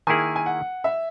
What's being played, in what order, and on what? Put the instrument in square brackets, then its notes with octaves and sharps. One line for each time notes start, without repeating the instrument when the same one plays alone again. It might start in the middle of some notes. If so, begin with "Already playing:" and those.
[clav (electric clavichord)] D#3 A#3 E4 G#4 [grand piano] G#5
[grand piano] G#5
F#5
E5